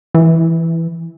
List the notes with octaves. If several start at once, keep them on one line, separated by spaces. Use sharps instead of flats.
E3